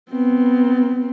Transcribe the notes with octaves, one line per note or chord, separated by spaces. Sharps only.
B3 C4